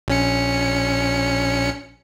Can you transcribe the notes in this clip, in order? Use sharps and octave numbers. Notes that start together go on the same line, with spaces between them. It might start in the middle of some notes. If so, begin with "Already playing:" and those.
A#1 C#4 C#7